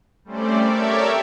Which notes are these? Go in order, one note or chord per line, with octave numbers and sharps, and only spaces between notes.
G3 A3 C4 C#4 C5 D5
G4 A4 A#4 C#5 D5 E5